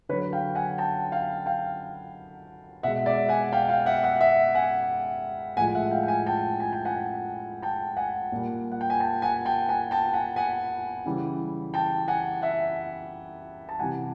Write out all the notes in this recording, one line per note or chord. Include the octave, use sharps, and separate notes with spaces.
D3 F#3 B4 C#5
F5 G5
F#5 G#5
G5 A5
F5 G5
F5 G5
B2 G#3 E5 F#5
D5 E5
F#5 G#5
F5 G5
F5 G5
E5 F#5
E5 F#5
E5 F#5
F#5 G#5
A2 F3 G#3 F#5 G#5
E5 F#5
F5 G5
G5
F#5 G#5
G5 A5
G#5
G5
F#5 G#5
G5 A5
F#5 G#5
A#2 G3
F#5
G5
G#5
G5 A5
F#5 G#5
G5 A5
F#5 G#5
G5 A5
F#5 G#5
F#5 G#5
C#3 E3 G3
G5 A5
F#5 G#5
E5 F#5
A5
C3 E3 G3 F#5 G#5